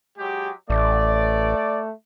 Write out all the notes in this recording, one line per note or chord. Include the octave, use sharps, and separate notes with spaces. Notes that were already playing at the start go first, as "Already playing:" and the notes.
F#3 G#3 G4
A1 A3 D5